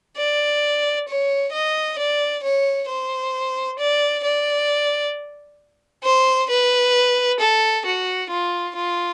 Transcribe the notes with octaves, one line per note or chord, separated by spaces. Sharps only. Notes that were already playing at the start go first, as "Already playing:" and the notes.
D5
C#5
D#5
D5
C#5
C5
D5
D5
C5
B4
A4
F#4
F4
F4